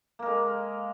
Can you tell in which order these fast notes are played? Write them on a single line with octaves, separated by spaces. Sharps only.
A#3 A#4 G#3